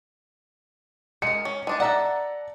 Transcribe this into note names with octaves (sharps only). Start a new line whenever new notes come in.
G#3 A#4 C#7
C#4
G#3 D4 D#4
A4 D5 E5 F#5 A#5